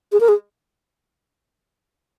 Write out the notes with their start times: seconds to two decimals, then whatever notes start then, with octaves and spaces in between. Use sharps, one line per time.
0.12 G#4
0.20 A#4
0.28 G#4